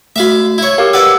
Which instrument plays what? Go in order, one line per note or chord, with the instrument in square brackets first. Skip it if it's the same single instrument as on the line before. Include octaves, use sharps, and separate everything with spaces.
[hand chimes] A3 F#4 [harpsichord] E5 F5 B5
[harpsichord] E4 C#5
[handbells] G4 F5 [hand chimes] A#4
[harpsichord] B4 D5 [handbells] F#5 E6